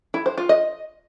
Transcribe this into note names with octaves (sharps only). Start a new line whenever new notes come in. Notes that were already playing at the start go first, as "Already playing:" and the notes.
E4
C5
F4
D#5